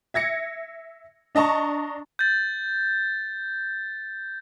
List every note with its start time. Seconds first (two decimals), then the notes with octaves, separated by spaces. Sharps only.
0.14 E5 G#6 A#6 C#7
1.35 D4 D#5 A5 A#5 C#6
2.19 G6 A6